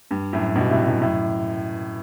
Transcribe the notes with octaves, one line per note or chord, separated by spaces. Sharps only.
G2
F#2 A2
G2 B2
A2 C3
F#2 A2
F#2 A2